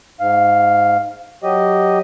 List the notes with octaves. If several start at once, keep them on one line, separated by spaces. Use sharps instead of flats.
G#2 F5
F#3 G4 D#5